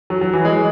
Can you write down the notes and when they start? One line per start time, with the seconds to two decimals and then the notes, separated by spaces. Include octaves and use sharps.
0.10 F#3
0.21 F#3
0.33 E3
0.45 G#3